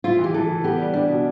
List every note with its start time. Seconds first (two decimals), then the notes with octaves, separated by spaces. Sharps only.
0.04 E4 F4
0.19 E3
0.24 G4
0.34 E3 A4
0.48 E3
0.64 B3 G4
0.78 G3
0.93 G3 D4
1.09 B2